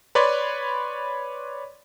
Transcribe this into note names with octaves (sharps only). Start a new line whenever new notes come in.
B4 C#5 D5 B5 C6